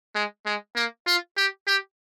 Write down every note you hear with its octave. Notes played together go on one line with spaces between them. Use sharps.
G#3
G#3
A#3
F4
G4
G4